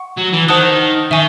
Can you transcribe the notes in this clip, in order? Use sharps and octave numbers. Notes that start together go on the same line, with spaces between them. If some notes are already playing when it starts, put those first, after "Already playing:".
Already playing: F#5 C#6
F#3
E3
D#3 C5 F#5 A5 D#6 F#6
D#3 E5 G#5 C#6